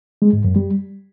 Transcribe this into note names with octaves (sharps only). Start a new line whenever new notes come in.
G#3
G#2
F#2
G3